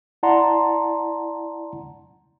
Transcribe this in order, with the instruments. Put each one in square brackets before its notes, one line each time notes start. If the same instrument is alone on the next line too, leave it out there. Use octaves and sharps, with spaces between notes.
[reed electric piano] E4 D5 F#5 A5 A#5 C6